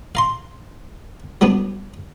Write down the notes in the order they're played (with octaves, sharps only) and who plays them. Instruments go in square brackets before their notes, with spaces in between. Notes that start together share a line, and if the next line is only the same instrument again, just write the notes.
[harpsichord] F5 A#5 C6
F#3 G3 B3 D4